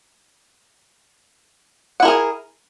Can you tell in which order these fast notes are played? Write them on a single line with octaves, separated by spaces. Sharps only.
F#5 E4 A#4 G#4